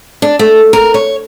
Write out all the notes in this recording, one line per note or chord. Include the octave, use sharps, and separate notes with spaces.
D4
A3
A#4
C#5